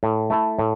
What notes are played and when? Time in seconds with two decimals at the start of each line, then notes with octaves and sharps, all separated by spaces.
0.03 A2
0.30 A3 E4 A4
0.59 A2